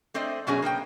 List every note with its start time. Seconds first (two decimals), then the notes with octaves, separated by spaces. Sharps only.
0.14 A3 C4 C5 D5 D#5
0.47 F#2 B2 F#3 C#4 D4 G#4
0.62 A#3 B3 E5 G5